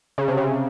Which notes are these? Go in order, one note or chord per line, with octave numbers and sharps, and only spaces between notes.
C#3
C3
C#3